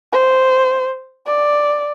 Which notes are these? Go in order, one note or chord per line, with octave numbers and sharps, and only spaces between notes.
C5
D5